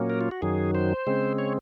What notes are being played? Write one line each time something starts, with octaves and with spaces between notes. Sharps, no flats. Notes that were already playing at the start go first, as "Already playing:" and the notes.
Already playing: A#2 F#3 A#3 C#4
A#4
F4
F#4
F#2 D#3 F#3 G#4
C5
C#3 G#3 C4
C#5